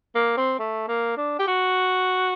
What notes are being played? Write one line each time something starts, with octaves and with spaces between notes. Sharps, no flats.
A#3
C4
A3
A#3
D4
G4
F#4